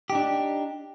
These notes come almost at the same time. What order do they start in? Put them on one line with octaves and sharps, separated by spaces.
G4 D#4 D4